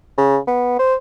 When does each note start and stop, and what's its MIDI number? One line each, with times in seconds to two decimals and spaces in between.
0.18 0.38 49
0.48 0.77 59
0.79 0.94 72